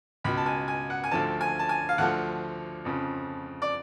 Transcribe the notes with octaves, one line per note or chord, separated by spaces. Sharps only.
C#2 B2 B5
A5
G#5
G#5
F#5
G#5
D2 D3 F3 A5
G#5
A5
G#5
F5
D2 D3 F3 F#5
F2 C#3 F3
D5